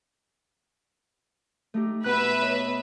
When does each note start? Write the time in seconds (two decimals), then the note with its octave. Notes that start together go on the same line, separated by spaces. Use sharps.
1.74 A3 D#4 G4
2.04 B2 B3 B4 E5 F#6
2.41 C#5 D#5